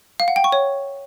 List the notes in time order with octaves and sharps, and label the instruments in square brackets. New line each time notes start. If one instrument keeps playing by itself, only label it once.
[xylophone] F5
F#5
G5
C#6
C#5